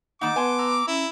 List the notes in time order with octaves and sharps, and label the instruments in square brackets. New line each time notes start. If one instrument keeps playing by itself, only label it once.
[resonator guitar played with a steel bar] D#3 D#4 [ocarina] A#3 [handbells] F#5 [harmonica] D6
[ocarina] B3 [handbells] B4 A5 C6 [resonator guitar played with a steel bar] G#5
[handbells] A#5 E6
[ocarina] C#4 [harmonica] E4